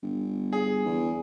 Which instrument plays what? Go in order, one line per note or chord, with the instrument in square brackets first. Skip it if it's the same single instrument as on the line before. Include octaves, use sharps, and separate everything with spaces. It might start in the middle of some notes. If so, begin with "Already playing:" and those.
[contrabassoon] G1
[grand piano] G#4
[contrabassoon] E2